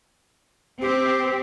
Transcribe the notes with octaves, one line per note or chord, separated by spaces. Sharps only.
C4 G4